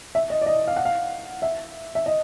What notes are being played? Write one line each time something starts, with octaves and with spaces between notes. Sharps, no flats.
E5
D#5
D5
D#5
F5
F#5
F5
E5
E5
D#5